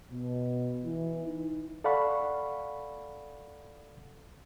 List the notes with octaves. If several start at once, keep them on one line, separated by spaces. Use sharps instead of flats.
B2
E3
D#4
A4 D5 F5 F#5 B5 C#6